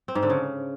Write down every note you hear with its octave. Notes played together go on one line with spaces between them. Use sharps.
C4
G#2
D3
C#3